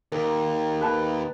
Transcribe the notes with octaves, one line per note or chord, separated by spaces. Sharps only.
D#2 A#4
B4 A5